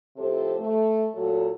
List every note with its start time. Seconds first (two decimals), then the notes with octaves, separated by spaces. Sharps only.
0.16 A2 C3 F3 G4 A4 C5
0.59 A3
1.14 A#2 F#3 F#4 A4